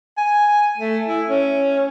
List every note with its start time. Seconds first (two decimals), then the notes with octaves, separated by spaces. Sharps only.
0.17 G#5
0.78 A3
1.07 E4
1.29 C#4